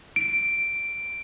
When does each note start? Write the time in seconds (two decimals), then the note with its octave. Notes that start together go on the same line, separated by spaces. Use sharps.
0.16 D7